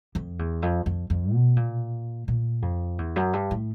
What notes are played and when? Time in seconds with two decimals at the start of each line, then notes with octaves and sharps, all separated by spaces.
0.15 F2
0.39 E2
0.62 F2
0.86 F2
1.10 F2
1.33 B2
1.56 A#2
2.28 A#2
2.62 F2
2.98 E2
3.16 F#2
3.33 G2
3.51 A2